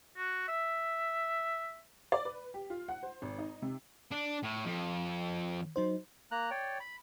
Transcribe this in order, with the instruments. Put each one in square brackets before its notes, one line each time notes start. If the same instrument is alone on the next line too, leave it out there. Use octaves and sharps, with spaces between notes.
[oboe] F#4
E5
[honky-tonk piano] D5
B4
G4
F4
F#5
C5
G#1
D#4
C3
[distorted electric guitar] D4
A2
F2
[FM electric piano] F#3 D#4 C5
[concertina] A#3 A#5 F#6
C#5 D5 G5
B5